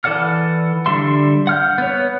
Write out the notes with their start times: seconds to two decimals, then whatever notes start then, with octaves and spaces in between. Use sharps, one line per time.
0.04 E3 A4 D5 F#5 F6
0.86 D3 G3 E5 C6
1.47 F#5 F6 G6
1.78 B3 C#5